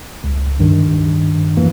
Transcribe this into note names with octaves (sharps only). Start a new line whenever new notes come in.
C#2
G2 D#3
F#2 E3 A#3